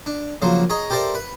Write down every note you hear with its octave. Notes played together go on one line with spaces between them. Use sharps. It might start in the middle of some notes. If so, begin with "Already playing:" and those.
D4
C#3 F3 F#3 A#3
G#4 C#5 D#5 A#5
G4 A4 A#4 C5 D5 E5
B4